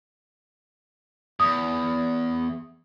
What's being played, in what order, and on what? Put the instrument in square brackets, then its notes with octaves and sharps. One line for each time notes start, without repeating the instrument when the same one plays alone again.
[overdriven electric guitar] E2 [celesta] D#6